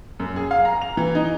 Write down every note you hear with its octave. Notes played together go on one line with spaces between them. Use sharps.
F#2
G#4
F5
A#5
F7
E3
D#4